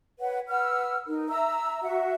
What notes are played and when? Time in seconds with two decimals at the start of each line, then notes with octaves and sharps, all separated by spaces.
0.19 B4 C#5 F#5
0.49 B4 F#5 E6 F6
1.07 D#4 A#4
1.29 E5 A#5 E6
1.82 F#4 E5 F#5